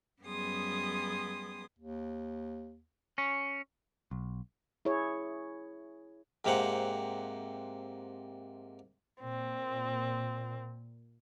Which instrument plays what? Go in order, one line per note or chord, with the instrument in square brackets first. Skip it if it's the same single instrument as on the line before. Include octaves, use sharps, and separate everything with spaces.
[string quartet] F#2 G3 B3 G#4 C6 D#6
[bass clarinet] D#2
[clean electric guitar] C#4
[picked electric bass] B1
[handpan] E4 G#4 C#5
[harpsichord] G#2 C3 A#3 C4 F#5
[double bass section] A#2 [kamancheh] C4